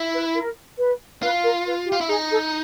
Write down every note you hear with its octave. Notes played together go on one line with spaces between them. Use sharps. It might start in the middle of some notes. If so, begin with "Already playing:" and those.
Already playing: E4
B4
A#4
B4
F4 B4
A#4
B4
G4
F4
E4
D#4 G#4
A4